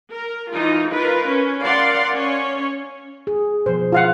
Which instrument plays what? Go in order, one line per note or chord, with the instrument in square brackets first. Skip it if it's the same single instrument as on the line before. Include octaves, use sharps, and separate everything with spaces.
[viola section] A#4
E3 D#4 F4
F4 A#4 B4
C#4
A#4 D5 F5 F#5 C6
C#4 C#5
[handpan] G#4
[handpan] B2 F3 [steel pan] C5
[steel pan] F4 F5 F#5